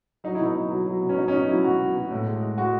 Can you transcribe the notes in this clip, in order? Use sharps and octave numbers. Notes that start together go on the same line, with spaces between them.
F#3 D#4
B2 E4
D#4
F#3
F#3
F#3
B2
C#4
F#3 D#4
C#4
B2 D#4
F#3 E4
F#3 F#4
B2
B2
A2
G#3
G#3
G#3 F#4